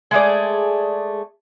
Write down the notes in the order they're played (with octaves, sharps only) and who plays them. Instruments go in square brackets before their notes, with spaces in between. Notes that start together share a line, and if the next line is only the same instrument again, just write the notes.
[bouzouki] G#3 A3 G#4 D5